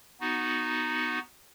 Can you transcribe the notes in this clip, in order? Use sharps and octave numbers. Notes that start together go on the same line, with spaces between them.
B3 D#4 F#4